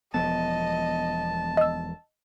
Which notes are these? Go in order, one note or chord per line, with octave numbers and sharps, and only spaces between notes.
E1 F3 B3 D#5 A5
D#5 E6